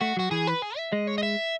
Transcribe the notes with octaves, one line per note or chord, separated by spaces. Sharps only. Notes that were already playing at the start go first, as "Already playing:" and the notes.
A3 F#4
F#3 F#4
E3 G#4
B4
G#4
E5
G#3 D#5
C#5
D#5
E5